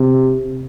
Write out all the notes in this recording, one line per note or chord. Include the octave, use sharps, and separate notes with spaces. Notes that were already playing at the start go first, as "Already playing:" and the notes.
Already playing: C3